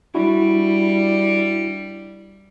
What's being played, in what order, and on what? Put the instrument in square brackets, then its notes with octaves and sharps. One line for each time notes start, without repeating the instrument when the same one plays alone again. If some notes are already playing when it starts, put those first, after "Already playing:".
[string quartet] G3 [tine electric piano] D4 E4 F#4